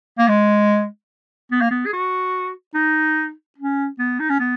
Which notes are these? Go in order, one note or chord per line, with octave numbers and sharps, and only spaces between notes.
A#3
G#3
B3
A#3
B3
G#4
F#4
D#4
C#4
B3
D#4
C#4
B3